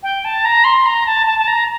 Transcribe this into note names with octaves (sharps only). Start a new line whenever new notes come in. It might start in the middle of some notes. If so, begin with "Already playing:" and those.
G5
A5
A#5
C6
A#5
A5
A5
A5
A#5